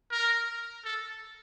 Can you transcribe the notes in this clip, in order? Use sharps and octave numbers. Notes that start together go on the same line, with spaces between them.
A#4
A4